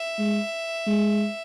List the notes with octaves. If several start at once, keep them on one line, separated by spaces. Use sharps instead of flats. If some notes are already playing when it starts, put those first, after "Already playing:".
Already playing: E5
G#3
G#3